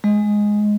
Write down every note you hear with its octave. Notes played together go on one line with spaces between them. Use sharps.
G#3